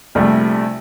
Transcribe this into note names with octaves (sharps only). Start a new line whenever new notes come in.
A#1 C3 G3 A3